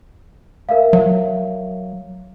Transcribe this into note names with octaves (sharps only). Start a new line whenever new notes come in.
A#4 E5 F5
F#3